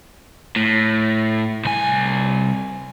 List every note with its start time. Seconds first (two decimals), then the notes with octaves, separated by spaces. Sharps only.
0.56 A2
1.65 C2 G#5